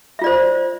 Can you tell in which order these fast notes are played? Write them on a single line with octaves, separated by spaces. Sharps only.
E5 F4 D5 C5